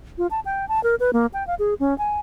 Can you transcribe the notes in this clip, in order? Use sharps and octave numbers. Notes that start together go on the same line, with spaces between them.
F4
A5
G5
A5
A#4
B4
A#3
G5
F5
G#4
C#4
G#5